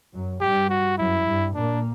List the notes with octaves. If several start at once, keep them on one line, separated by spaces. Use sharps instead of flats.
F#2 F#3
G2 G3 G4
F#4
F#2 F#3 E4
G2 G3
A#2 A#3 D4